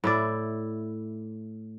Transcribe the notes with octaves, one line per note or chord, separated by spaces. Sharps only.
A2 E4 D5